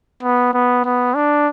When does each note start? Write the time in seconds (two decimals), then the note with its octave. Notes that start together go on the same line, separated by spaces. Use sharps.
0.23 B3
0.54 B3
0.85 B3
1.16 D4